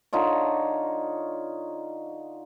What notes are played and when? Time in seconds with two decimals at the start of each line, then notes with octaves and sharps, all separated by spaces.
0.13 D3 D#4 F4 C#5